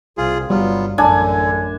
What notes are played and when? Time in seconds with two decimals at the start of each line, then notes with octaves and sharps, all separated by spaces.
0.17 C2 C3 F4 G#4
0.50 G1 F#3 G3 B3 F4
0.98 A1 F#2 D3 D4 G#5